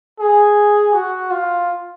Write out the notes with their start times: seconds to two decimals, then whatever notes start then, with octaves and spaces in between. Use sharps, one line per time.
0.20 G#4
0.94 F#4
1.31 F4